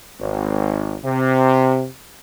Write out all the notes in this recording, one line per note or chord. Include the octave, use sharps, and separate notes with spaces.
G#1
C3